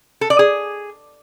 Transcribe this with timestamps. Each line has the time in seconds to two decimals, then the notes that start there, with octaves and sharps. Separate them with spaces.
0.21 A4
0.30 D5
0.39 G#4